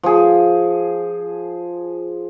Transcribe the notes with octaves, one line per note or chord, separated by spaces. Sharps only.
F3 G#4